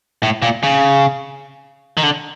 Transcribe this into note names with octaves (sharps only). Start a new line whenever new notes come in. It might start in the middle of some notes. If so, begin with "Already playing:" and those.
A2
A#2
C#3
D#3
D3